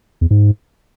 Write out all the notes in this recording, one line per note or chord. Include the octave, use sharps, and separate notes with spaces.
E2
G#2